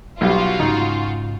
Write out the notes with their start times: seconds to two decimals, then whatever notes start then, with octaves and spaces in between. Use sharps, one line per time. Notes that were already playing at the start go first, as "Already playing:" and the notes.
0.21 B1 G3 F4 F#4
0.60 G#2 C#3 D#4